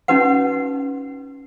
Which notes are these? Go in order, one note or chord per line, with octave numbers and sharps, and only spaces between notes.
C#4 D#4 F#4 B4 F#5